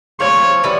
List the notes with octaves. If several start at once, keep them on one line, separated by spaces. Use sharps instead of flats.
F3 A3 C4 C#5
E3 G3 B3